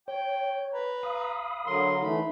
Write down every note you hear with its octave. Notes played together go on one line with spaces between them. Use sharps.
C#5 G5
B4 A#5
F5 B5 D#6
D3 F#3 A#4 C6
E3 A3 D#4 B5